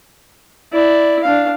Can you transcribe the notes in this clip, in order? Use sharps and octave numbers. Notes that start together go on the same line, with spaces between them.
E4 D5
D4 F5